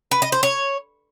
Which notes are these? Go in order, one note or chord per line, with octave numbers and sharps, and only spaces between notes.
B4
D#5
C5
C#5